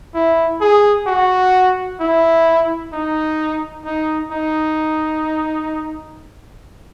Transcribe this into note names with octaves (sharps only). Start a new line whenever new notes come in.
E4
G#4
F#4
E4
D#4
D#4
D#4